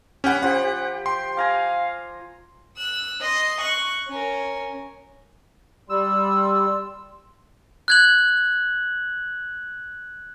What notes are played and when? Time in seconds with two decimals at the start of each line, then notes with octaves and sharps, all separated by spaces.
0.24 C#4 G4 F#5 B5
0.42 F3 G4 F#5
1.06 G5 C6
1.37 F5 G#5 A#5 D6
2.77 E6 F#6
3.21 D#5 C6
3.61 C#6 F#6
4.09 C#4 A#4
5.89 G3 C6 E6
7.88 F#6 G#6 F#7